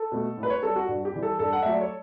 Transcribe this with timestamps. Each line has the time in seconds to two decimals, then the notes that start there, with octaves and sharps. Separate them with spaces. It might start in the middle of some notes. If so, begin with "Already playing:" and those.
Already playing: A4
0.12 B2 A3
0.37 A2
0.43 B4
0.50 C#5
0.63 G3 A4
0.76 F#4
0.88 G2
1.05 G4
1.14 E3 G3
1.23 A4
1.39 G2 A4
1.53 F#5
1.62 F#3 A3 E5
1.72 D5
1.81 C#5